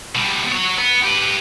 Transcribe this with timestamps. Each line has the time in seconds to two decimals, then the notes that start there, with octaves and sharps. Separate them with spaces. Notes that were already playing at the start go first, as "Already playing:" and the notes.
0.15 B2 G3
0.52 F#3 C#5
0.78 B3
1.05 G4 B4